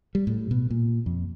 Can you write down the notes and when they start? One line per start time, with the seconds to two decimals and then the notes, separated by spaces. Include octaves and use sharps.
0.15 G3
0.27 A2
0.51 B2
0.70 A#2
1.06 F2